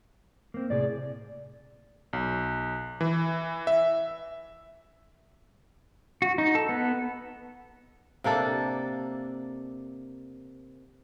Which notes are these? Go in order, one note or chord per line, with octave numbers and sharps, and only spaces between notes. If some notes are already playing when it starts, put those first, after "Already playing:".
A#3 C4
A2 C3 G#4 D5
B1
E3
E5
F#4
D#4
A4
B3
C3 A#3 D4 A4